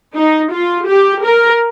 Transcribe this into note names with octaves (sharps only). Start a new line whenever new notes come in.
D#4
F4
G4
A#4